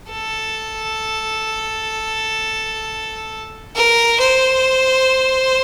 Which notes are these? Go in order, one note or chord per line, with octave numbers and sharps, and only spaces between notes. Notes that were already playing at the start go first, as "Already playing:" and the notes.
A4
A#4
C5